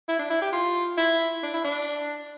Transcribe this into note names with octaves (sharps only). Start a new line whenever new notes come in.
E4
D4
E4
G4
F4
E4
D4
E4
D4